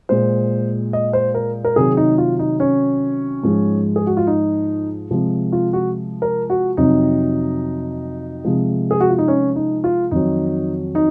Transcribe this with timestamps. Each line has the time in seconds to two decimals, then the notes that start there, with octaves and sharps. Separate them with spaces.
0.09 A#2 G#3 C5
0.93 D#5
1.13 C5
1.35 A#4
1.65 A#4
1.76 C3 D#3 F#3 G#4
1.97 D#4
2.18 F4
2.39 D#4
2.60 C#4
3.43 G#2 F3 G#3
3.96 G#4
4.07 F#4
4.17 F4
4.27 D#4
5.11 C3 F3 G#3
5.53 F4
5.73 F#4
6.22 A#4
6.50 F#4
6.77 F2 C3 F#3 D#4
8.45 C3 F3 G#3
8.91 G#4
9.00 F#4
9.10 F4
9.18 D#4
9.28 C#4
9.56 D#4
9.84 F4
10.11 F2 D#3 F#3 D#4
10.95 D#4